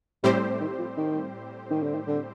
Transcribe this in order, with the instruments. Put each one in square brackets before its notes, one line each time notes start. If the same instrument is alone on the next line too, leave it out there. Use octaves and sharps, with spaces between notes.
[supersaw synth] A2 G3 C4 G4 C5 [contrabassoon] C3
[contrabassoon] D#3
F3
D#3
D#3
D3
D#3
D3